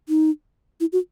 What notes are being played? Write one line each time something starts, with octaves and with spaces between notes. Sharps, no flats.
D#4
E4
F#4